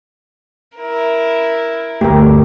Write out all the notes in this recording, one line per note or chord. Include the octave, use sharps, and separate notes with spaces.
E4 A#4
G1 D2 A3 G4 A#4